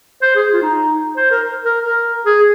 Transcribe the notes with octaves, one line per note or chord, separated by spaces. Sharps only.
C5
G#4
F4
D#4
C5
A#4
A#4
A#4
G#4